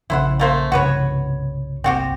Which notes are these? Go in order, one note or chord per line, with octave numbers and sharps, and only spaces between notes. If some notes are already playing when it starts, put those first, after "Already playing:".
A#1 C#3 C#4 E4 C5 F#5
A3 A#3 C5
C2 G2 C#3 F#4 B4 C#5
G1 C2 C4 F#4 G4